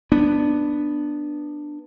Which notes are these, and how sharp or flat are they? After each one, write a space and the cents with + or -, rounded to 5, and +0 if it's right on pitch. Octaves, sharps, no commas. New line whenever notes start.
B3 +0 D4 +10